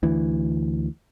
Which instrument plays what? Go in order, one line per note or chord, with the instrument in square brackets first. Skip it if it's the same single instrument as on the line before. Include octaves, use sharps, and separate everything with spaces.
[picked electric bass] D2 E3